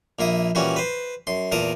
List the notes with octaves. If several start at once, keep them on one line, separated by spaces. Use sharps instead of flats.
A#1 A#3 E4 D#6
A#2 E3 G3 C#4 F#4
B4 C5
F#2 C6
E2 A#2 A#4 A5 D#6